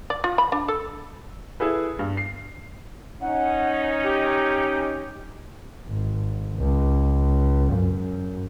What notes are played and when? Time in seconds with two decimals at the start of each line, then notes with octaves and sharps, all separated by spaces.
0.10 D5
0.24 F4
0.38 B5
0.52 D4
0.68 A4
1.60 E4 G#4 A4 B4
1.99 G2
2.17 C7
3.21 C#4 D#4 F#5
4.03 G4
5.88 G#1
6.58 C#2
7.72 F#2